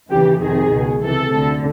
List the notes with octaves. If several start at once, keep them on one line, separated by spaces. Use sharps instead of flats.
D#2 C#3 E3 G4
F2 C3 D#3 G#4
C#2 B2
C#2 C3 E3 A4
D2 D3